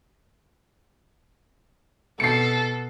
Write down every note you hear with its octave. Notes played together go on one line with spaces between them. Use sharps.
B2 A4 C7 C#7